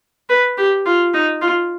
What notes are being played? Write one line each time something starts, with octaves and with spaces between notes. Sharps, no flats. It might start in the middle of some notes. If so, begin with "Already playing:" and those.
B4
G4
F4
D#4
F4